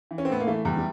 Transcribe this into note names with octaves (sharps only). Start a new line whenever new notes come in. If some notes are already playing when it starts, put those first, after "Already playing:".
E3
C#4
C4
A2 B3
A#3
E3 A3
E2 G3
G3